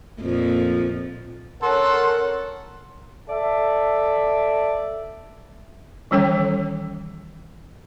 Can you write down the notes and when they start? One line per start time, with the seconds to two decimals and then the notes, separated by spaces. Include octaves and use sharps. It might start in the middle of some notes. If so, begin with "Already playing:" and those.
0.20 F2 A#2 F3
1.62 C#4 A4 A#4 F#5 C6
3.29 A4 D5 E5
6.11 D#3 E3 G3 C#4 A4 G5